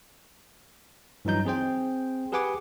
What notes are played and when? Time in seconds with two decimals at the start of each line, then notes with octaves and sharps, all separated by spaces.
1.25 G2 E3 F#3 D#4 G6
1.45 C4 G#4 C5 G5
2.32 G4 G#4 B4 F#5 G#5 D6